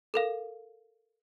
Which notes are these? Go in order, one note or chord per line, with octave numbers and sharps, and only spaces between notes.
A4 A#4 F5